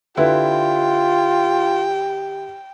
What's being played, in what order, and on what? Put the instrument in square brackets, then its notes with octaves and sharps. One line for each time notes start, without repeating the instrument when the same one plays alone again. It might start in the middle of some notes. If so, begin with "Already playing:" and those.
[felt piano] D3 E4 B4 [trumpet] F4 [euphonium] G4 [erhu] G5